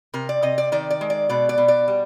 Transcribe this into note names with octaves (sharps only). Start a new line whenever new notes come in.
C3 A#4
D5
C3 D#5
D5
D#3 D5
D5
G#3
D5
B2 D5
D5
B2
D5
G3